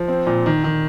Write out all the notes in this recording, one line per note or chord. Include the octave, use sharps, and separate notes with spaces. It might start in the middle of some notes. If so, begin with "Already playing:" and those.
Already playing: F3
C4
A#2
D#3
D#3